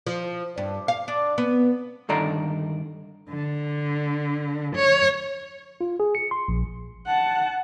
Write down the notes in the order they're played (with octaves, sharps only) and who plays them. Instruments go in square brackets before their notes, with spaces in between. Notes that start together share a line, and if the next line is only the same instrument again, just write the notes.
[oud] F3
G2
F5
D4
B3
[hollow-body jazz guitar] G2 D3 D#3 A4 D5 A#5
[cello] D3
C#5
[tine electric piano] F4
G#4
C#7
C6
A#1
[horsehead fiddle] F#5 A5